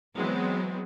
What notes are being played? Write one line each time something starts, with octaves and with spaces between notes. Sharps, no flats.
E3 F#3 G#3 B3 C4